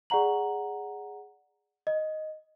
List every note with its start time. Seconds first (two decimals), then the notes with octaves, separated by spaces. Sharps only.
0.10 G#4 D5 F#5 A#5 F#7
1.87 D#5